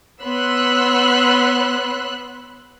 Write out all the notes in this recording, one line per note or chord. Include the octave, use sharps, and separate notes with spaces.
B3 C#5 B5 C6 E6 F#6